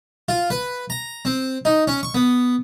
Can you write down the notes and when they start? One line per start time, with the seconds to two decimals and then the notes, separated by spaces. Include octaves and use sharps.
0.29 F4
0.50 B4
0.90 A#5
1.25 C4
1.65 D#4
1.88 C#4
2.03 C#6
2.15 B3